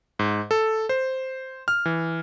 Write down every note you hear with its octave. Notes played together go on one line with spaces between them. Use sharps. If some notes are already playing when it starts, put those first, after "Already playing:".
G#2
A4
C5
F6
E3